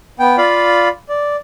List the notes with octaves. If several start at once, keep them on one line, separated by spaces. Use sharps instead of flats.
B3 G5
F4 D5 F5 B5
D5